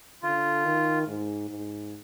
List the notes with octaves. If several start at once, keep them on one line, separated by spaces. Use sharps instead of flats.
D3 F4
D#3
G#2
G#2